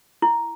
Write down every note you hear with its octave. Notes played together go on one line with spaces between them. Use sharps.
E4